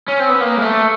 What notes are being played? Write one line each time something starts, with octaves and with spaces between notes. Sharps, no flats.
C#4
C4
B3
A#3
G#3
A3